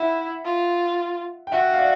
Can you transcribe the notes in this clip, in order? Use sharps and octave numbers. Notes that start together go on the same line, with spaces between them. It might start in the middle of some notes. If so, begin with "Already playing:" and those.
Already playing: E4 E5 F#5
F4
G5
F#4 E5 F#5
F5
D5 E5